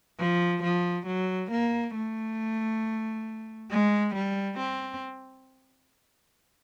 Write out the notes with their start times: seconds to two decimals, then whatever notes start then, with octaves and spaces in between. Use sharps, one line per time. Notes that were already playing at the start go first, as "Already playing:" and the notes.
0.19 F3
0.63 F3
1.07 F#3
1.52 A#3
1.95 A3
3.71 G#3
4.15 G3
4.59 C4